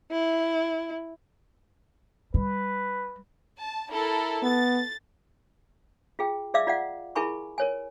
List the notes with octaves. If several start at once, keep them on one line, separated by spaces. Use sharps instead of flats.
E4
G3 B4
A5
E4 A4 A#4
B3 A6
F4 G#4 G5
G#4 D5 E5 F5 D6 E6
F4 D5 F5 F#5
E4 G#4 A#4 G#5 B5 C#6
A#4 C#5 G#5